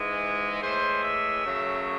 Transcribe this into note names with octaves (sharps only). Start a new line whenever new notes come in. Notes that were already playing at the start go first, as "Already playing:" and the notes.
Already playing: G#2 E3 G#3
A2 E3 G#3 C5
E5
F#2 C#3 F#3 A3